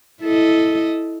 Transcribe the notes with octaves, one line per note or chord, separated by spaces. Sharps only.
E4 A4 D#5